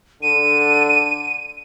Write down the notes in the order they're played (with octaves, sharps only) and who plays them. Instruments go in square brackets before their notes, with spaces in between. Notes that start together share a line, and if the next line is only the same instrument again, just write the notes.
[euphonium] D3 [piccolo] D#7